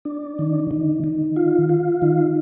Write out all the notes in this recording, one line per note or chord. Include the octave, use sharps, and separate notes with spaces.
D4
D#3
D#3
D#3
F4
F4
D#3